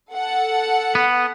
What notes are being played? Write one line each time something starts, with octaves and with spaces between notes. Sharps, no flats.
A4 F#5
B3